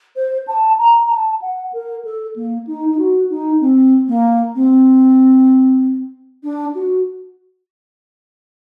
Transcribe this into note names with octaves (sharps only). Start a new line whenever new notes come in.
C5
A5
A#5
A5
F#5
A#4
A4
A#3
D#4
D#4
F#4
D#4
C4
A#3
C4
D4
F#4